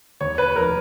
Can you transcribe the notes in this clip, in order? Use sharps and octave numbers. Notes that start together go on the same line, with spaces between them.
D#2 C#5
B4
F1 A#4